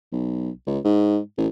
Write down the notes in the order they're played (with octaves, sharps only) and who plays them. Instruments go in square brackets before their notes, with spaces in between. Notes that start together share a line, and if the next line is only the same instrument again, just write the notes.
[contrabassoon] B1
C#2
G#2
A1